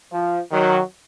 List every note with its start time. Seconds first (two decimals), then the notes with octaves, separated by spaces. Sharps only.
0.12 F3
0.51 D#3 F#3